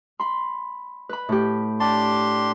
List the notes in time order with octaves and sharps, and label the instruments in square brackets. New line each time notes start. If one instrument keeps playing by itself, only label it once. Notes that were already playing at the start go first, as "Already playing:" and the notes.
[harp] B5 C6
B4 B5
A2 G4
[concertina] D4 G4 C6 [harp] A5